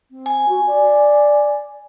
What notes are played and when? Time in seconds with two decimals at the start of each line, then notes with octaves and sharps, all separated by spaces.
0.11 C4
0.26 G#5
0.49 F#4
0.67 D5